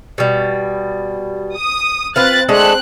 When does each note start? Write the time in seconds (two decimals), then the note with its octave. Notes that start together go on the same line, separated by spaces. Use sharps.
0.18 B2 G3
1.56 D#6
2.16 C4 F4 B4 F5 F#6 A6
2.49 G#3 A3 C4 D4 F#6